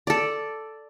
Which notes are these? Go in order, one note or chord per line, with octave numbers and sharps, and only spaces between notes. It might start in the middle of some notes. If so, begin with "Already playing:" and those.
A4 D5